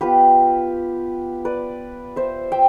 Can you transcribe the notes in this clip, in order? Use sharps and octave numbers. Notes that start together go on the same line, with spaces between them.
B3 F4 G4 B4
B4 D5
C5 E5
E5 G5